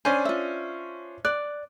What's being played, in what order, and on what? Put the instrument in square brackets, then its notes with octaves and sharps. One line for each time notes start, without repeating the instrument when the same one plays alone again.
[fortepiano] C#4 D4 C5 [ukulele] G#5
[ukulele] F4 E5
[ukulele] D5 [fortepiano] F#6